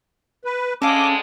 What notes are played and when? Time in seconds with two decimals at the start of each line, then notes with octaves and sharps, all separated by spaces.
0.45 B4
0.82 A2 D3 G#3 C#4 A4 F5 D6